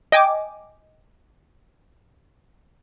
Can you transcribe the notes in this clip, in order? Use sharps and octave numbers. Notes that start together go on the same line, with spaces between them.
D#5 G5 G#5 D6